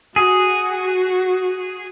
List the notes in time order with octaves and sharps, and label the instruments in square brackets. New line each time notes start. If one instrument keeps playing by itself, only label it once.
[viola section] F#4 [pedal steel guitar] G#4